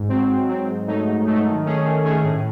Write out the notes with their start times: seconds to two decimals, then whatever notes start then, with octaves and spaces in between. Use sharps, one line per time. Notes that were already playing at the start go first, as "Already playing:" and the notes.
Already playing: G#2
0.08 F#3 C4
0.28 G#2
0.48 F#3 C4
0.66 G#2
0.87 F#3 A3 D#4
1.06 G#2
1.25 F#3 A3 D#4
1.46 D#3
1.65 A3 C#4 G#4
1.84 D#3
2.04 A3 C#4 G#4
2.24 A2